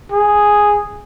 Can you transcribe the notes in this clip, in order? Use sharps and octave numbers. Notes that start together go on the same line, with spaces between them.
G#4